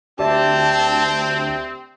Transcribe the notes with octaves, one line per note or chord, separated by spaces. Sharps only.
D2 C4 G4 D5 E5 A5